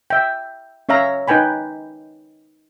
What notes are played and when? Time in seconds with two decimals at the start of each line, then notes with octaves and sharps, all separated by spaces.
0.10 E5 G5
0.89 C#4 C#5 E5 F5 A#5
1.28 D#4 B4 G5 G#5 B5